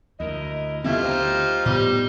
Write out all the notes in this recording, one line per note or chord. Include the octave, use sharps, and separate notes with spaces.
D2 E4 A#4 D#5
C#3 A3 B3 C4 E4 F4 G4
D2 D#4 C5
A2 G3 B3